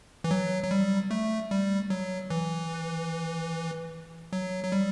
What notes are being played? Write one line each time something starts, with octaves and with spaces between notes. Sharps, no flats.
E3
F#3
F#3
G3
A3
G3
F#3
E3
F#3
F#3
G3